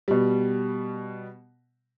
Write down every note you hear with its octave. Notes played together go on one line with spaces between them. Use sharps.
B2 G3